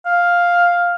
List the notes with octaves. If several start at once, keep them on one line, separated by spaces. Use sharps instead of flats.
F5